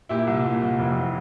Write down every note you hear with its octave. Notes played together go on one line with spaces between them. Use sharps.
A#2 E4 G4
C2
A#2
C2
F1
E3